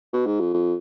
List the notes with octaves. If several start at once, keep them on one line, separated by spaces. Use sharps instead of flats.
B2
G#2
F2
F2